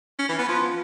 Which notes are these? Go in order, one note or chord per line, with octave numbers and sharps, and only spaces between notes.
C#4
E3
B3
F3